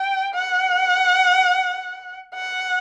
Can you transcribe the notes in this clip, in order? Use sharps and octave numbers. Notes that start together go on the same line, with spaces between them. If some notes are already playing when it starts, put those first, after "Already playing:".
Already playing: G5
F#5
F#5